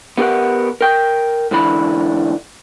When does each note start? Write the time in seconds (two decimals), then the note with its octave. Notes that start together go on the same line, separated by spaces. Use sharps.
0.18 B3 G4 A#4 F#5
0.81 A#4 G5
1.51 G#2 D3 E3 B5